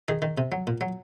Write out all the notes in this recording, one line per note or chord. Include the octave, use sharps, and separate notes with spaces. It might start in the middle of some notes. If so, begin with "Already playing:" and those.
D#3 G#4
D#3
C3
F#3
A#2
F#3